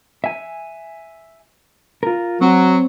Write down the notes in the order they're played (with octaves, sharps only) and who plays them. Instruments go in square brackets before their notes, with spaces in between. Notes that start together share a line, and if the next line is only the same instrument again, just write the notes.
[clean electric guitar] E5 G#5
F4 A#4
[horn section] F#3 [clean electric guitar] C4